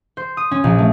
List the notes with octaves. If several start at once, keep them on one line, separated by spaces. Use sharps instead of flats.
C5
D#6
C#4
A#1
A3